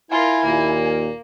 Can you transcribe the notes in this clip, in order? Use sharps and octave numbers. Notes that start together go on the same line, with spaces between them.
E4 F4 A#4 G#5
D#2 A#2 A#3